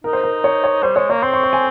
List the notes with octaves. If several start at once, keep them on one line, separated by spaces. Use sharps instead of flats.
D#4 A#4
C5
A#4
C#5
C#5
G3 C5
G#3 C#5
A#3 C#5
C4 C6
C#6
C#6
G#5